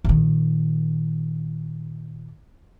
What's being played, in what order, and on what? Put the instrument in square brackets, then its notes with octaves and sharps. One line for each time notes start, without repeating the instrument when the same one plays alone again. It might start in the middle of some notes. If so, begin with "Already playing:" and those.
[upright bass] A#2 D#3